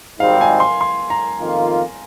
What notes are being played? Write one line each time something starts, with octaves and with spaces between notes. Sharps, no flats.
G#1 G#2 G3 C4 D#4 F5
G#5
C6
C6
A#5
F2 D#3 A#3 F4